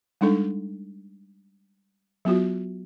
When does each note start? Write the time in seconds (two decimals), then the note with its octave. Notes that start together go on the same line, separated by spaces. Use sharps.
0.21 G3 G#3 D4 D#4 A4
2.25 F#3 B3 F4 F#4